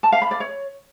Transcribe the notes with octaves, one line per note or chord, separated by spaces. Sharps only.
A5
F5
B5
D5
C#5